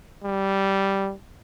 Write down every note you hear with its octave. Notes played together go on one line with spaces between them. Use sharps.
G3